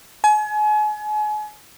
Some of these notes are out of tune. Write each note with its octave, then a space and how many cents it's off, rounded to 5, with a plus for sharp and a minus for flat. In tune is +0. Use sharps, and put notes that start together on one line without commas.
G#5 +35